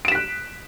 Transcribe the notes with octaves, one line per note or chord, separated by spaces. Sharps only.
F#6 B6 D7 E7